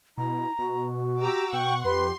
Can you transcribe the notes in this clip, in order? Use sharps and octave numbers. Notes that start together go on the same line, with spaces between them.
B2 E4 A#5
B2 F#4
G4 A#5 D6 E6
B2 F#5 G5 C#6
F2 G4 B4 C6